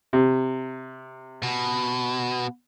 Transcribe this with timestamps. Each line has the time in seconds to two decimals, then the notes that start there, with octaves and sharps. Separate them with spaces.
0.13 C3
1.43 B2